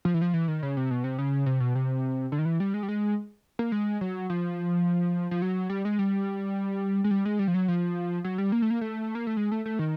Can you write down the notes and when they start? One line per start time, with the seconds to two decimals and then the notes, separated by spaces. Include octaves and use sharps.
0.05 F3
0.14 E3
0.22 F3
0.34 E3
0.48 D#3
0.63 C#3
0.77 C3
0.91 B2
1.04 C3
1.18 C#3
1.46 C3
1.60 B2
1.75 C3
2.32 D3
2.39 D#3
2.45 E3
2.60 G3
2.74 G#3
2.83 G3
2.89 G#3
3.59 A#3
3.72 G#3
4.01 F#3
4.30 F3
5.31 F3
5.42 F#3
5.70 G3
5.85 G#3
5.99 G3
7.04 G#3
7.11 G3
7.25 G#3
7.39 G3
7.48 F3
7.54 F#3
7.68 F3
8.24 F#3
8.38 G3
8.52 A#3
8.62 A3
8.70 A#3
8.81 A3
9.15 A#3
9.27 A3
9.37 G#3
9.52 A3
9.66 A3
9.79 D#3